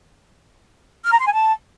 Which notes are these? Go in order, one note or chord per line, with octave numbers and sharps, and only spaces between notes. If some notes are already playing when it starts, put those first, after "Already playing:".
F6
A#5
C6
G#5
A5